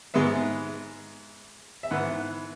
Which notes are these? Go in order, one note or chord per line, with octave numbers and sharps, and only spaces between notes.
G#2 G#3 B3 E5
E5
G#2 E3 B3 F#5